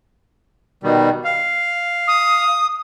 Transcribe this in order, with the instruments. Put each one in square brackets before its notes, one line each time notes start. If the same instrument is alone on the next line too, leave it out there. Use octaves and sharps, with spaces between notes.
[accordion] B2 D#3 G3
F5
[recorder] D#6